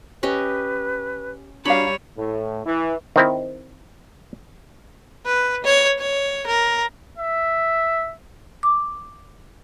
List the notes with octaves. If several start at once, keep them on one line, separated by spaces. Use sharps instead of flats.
C#4 G4 B4 D#5
G3 D4 F#4 C#5 F5 A#5 B5
A2
E3
D#3 C4 E4
B4
C#5
C#5
A#4
E5
D6